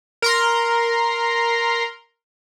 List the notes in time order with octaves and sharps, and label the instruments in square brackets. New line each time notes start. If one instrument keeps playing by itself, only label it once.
[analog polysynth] A#4 A#5 C6